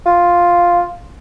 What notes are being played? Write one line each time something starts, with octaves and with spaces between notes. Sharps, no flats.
F4